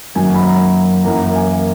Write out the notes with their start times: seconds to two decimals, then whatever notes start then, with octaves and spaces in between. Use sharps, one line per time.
0.15 F#2 D#3 F#3 A#3 G#5
0.35 B5
0.45 A#5
1.04 F#2 E3 A#3 A#5
1.35 G#5